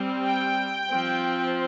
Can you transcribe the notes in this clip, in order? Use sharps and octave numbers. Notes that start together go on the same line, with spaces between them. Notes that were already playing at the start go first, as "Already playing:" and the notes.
Already playing: G3 C4
G5
F3 C4